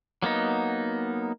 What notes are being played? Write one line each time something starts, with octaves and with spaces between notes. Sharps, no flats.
F#3 A#3 B3 D#4